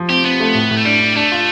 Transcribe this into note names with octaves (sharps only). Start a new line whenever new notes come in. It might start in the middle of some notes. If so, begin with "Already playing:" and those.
Already playing: F3
C4 G4
B3 C4
A3
A2
A2
A3
G3 D4
D4
A3 D4
F4